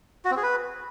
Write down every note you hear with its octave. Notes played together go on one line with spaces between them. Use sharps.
F#4
C4
G#4
B4